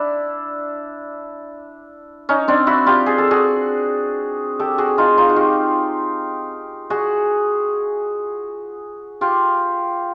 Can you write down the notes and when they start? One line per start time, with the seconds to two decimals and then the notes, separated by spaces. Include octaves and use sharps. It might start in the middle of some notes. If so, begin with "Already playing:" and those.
Already playing: D4 E4
2.29 C#4 D#4
2.48 C4 D4
2.67 E4 F#4
2.86 F4 G4
3.06 G#4
3.18 A4
3.31 F#4 G#4
4.59 G4 A4
4.78 F#4 G#4
4.98 D#4 F4
5.17 D#4 F4
5.29 F#4
5.36 F4 G4
6.90 F#4 G#4
9.21 F4 G4